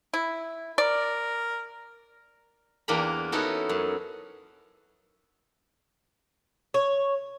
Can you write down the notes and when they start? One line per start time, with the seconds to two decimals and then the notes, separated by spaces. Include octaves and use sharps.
0.14 E4
0.78 A#4 D5
2.88 E2 A#3 D4 G5 A#5 B5
3.32 B3 C#4 D#4 E4 F#4 A4
3.69 F#2
6.74 C#5